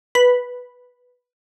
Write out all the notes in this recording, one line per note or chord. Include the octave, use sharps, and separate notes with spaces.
B4